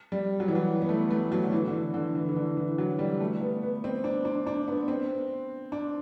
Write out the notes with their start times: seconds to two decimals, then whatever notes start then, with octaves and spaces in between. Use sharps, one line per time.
0.12 G3
0.40 F#3
0.48 E3
0.55 F#3
0.82 B3
0.89 A3
1.11 A3
1.32 F#3
1.46 D3
1.52 E3
1.68 D3
1.73 E3
1.94 D3
2.15 E3
2.29 E3
2.36 D3
2.57 E3
2.78 F#3
2.99 G3
3.21 A3
3.41 B3
3.63 B3
3.84 C4
4.04 D4
4.25 D4
4.46 D4
4.68 B3
4.88 C4
5.72 D4